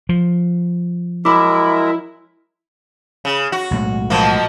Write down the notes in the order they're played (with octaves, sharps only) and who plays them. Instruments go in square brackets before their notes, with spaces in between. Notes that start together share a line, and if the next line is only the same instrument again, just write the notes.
[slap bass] F3
[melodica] F#3 G#3 A#4 [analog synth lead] E4 [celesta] B5 D6
[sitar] C#3
F#4
[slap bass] B1 A2 G#3
[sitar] B2 F3 A#3